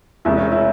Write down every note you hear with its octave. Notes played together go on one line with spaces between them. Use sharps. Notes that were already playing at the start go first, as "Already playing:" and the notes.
E1 E2 C3 E4
C#4
E4